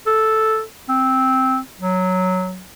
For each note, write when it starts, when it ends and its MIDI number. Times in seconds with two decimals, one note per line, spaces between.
0.06 0.62 69
0.89 1.58 60
1.80 2.63 54